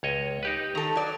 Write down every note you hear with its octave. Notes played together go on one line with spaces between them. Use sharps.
C#2 C#5 D#5
D#4 G4 B4
D#3 A4 A#5
F#3 D5